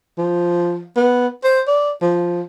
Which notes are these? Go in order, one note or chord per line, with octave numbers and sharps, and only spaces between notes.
F3
B3
C5
D5
F3